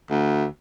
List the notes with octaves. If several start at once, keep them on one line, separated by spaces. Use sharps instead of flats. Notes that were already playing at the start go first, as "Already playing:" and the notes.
D2